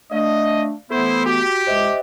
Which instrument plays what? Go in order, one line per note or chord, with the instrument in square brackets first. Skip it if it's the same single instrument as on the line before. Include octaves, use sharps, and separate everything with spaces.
[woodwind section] A3 D4 [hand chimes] D5 F5 [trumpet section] D#5
[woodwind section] E3 A3 B3 [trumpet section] E4 C5 [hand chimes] A4
[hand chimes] F#4 B6 [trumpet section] G4
[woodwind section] C#2 [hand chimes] C5 D#5 E5